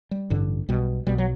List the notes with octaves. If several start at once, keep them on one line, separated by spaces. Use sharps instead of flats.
G3
A1 G2 D3
B1 B2 G3
B1 B2 G3
F#3